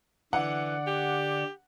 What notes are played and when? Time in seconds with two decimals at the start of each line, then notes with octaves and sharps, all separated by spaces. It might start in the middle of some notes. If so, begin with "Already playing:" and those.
0.33 D3 E3 D5 F#5
0.87 G4